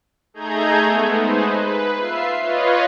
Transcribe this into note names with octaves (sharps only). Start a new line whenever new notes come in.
A3 D#4 G#4 A#5 G6 G#6
G#3 A3 B3
D#4 G#4 B4 C5
B4
F4 E5 C7
F4 B4 C#5 D#5